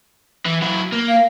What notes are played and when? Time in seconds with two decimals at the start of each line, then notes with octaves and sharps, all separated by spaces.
0.45 E3
0.61 F#3 E4
0.92 A#3
1.09 F5